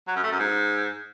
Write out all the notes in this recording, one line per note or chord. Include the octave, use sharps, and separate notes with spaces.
F#3
F#2
A3
F#2
G#2